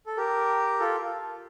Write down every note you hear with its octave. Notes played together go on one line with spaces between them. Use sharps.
A4
G4 A#4
F4 A4